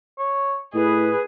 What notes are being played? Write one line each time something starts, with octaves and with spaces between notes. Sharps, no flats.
C#5
A2 G#4 B4 D#5